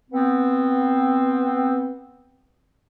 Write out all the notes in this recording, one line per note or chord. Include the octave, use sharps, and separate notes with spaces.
B3 C4